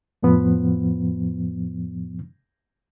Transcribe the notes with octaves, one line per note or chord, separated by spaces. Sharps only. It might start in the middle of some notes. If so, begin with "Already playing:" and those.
F2 A2 F3 B3